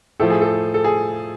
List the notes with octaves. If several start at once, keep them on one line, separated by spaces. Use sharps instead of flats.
A2 F3 A4
G#4
A4
A4
G#4